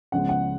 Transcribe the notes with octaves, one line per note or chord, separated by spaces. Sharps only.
C#2 C#3 F3 G#3 B3 F#5
F#5